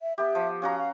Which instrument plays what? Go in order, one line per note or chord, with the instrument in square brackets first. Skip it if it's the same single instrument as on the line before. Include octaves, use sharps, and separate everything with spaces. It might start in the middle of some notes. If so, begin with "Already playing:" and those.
[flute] E5
[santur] B3 G4 [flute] E5
[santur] F3
[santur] C#4 F#4 A#5 [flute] F5
[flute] F5